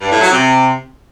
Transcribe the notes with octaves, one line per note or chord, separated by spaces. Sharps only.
G2
A2
F#3
C3